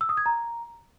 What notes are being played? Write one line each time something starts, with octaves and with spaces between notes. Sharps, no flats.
E6
D#6
G#6
A#5